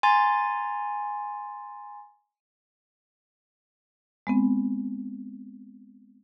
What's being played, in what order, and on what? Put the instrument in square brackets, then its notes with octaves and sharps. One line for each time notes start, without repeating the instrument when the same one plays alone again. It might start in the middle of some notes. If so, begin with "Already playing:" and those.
[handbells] G#5 A#5 C6 A6
[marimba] G#3 B3 C4